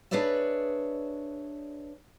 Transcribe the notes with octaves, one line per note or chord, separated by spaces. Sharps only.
D4 G#4 B4 C#5 D5 E5